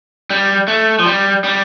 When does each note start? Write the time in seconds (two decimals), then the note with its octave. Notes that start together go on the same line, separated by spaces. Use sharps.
0.30 G3
0.68 A3
0.99 F3
1.06 G3
1.44 G3